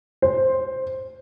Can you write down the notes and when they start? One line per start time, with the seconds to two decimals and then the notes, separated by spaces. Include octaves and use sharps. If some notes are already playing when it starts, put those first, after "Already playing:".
0.22 C5